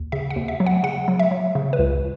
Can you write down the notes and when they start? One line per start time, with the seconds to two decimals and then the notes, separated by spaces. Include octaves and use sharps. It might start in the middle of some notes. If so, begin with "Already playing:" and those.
Already playing: D#2
0.12 C#3 E5
0.30 F#5
0.36 D#2
0.48 E5
0.60 F#3
0.66 F#5
0.83 C#3 F#5
1.08 F#3
1.19 E5
1.31 F#3
1.55 C#3
1.73 B4
1.79 C#2